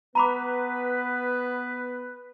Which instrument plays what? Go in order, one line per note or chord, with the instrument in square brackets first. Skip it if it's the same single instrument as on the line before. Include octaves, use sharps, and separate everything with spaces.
[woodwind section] B3 B4 [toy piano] A#5 B5 D6